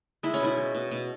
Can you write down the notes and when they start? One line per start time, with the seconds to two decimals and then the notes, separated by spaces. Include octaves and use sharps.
0.23 G#3 E4
0.34 C#4
0.40 B2 E4
0.57 G#3
0.75 B2
0.91 B2